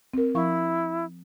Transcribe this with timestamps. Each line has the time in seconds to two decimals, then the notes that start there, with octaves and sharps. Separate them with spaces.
0.14 C4 A#4
0.35 F3 E4 F5 C#6